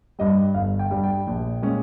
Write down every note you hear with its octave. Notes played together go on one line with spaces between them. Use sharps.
G2 G3 D#5
G1 F5
G5
G2 G3
G5
A#1
A#2 G#3 C#4